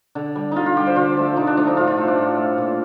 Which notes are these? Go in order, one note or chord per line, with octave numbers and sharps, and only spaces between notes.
D3
G3
D3 D#4 F4
F4
G3 G4
C5
D3 F4
F3 A3
D3 D#4
D4
F3 A3 D4
D#4
A2 F4
F4
A3
D4
A2
A3
A#2